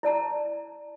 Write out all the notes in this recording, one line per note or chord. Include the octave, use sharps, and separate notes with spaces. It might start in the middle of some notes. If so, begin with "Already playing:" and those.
E4 D5 A5 A#5